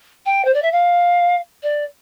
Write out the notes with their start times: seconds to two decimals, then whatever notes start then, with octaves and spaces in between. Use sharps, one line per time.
0.26 G5
0.45 C5
0.54 D5
0.62 E5
0.72 F5
1.63 D5